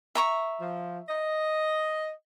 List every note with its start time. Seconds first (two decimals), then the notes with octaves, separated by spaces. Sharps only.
0.15 E5 A#5 C#6
0.60 F3
1.08 D#5